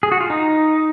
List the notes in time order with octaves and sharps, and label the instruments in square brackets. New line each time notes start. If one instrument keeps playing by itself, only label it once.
[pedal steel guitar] G#4
F#4
F4
D#4